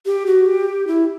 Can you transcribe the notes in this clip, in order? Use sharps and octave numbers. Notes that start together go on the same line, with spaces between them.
G4
F#4
G4
E4